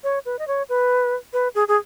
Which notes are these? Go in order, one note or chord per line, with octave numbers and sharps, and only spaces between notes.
C#5
B4
D#5
C#5
B4
B4
G#4
G#4